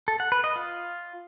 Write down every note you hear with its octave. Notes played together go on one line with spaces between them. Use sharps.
A4
F#5
B4
D#5
F4